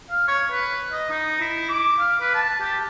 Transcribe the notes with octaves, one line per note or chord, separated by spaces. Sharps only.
F5
C#5
B4
D#5
D#4
E4
D6
F5
B4
A5
G4